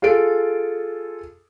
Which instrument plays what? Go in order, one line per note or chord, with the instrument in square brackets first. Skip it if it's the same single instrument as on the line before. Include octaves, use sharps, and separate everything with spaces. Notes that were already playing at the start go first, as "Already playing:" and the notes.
[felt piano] F4 G#4 A4 D7